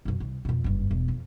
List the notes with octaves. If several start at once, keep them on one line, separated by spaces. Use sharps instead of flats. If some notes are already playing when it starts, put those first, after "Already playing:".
B1 F#2
C2
F2 B2
F#1 G2
E1
F2